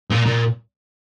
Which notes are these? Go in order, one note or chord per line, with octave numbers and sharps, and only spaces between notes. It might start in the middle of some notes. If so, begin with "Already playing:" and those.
A#2
A#2